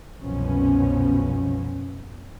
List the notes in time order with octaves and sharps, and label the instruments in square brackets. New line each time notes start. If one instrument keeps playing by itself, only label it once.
[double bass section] C2 F#2 B2 F3 B3 C#4